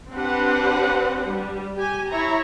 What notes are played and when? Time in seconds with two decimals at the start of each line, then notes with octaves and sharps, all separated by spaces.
0.13 C4 D4 G4 B4 C5 F#5
1.31 G3
1.77 G4 G#5
2.11 E4 C#5 E5 A#5